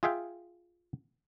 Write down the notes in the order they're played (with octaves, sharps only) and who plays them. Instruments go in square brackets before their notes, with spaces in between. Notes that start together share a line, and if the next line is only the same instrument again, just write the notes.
[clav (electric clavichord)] F4 G#4 E5 F5 G5